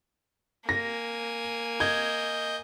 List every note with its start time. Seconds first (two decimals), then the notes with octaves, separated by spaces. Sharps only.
0.69 A#3 G#5 A#6
1.80 D#5 G6 G#6